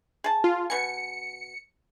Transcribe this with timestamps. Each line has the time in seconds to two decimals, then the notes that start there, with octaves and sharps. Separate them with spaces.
0.24 G#4 A5
0.44 F4
0.70 B2 G#5 C#7